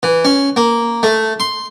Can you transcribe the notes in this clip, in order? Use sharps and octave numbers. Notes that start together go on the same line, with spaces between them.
E3
C#4
A#3
A3
C6